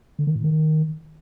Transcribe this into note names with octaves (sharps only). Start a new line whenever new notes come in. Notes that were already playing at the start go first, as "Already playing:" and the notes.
D3
D#3
A2
D#3